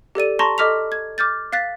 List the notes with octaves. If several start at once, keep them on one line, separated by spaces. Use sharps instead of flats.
G4 A4 D5 D#7
A5 A#5 C6 C#6 A#6
A4 D#5 D6 F6 B6 F7
G#6
D6 F6 G6 A6
F5 F#6 A6 B6